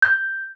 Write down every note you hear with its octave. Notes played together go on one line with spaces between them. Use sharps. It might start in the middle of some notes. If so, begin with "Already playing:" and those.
G6